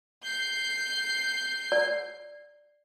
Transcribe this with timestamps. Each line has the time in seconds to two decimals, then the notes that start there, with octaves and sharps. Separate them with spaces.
0.24 G6 C7
1.72 D5